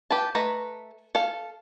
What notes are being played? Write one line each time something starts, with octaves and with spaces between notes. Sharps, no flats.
G4 B4 A5
A3 B4 D#5 A#5
A4 F5